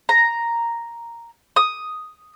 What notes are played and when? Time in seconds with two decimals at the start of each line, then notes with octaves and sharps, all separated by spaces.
0.09 A#5
1.56 D#6